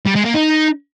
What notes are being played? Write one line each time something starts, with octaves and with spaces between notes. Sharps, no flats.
G3
G#3
A#3
D#4